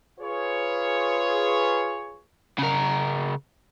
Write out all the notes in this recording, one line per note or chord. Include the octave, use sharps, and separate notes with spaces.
F4 G#4 B4 C#5
C#3 A#4